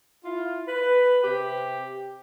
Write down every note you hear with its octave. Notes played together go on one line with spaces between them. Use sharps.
E4 F4
B4
C3 G4